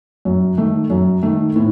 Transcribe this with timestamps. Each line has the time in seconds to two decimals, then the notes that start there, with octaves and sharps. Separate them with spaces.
0.25 F#2
0.57 D#3 A3
0.90 F#2
1.23 D#3 A3
1.56 A2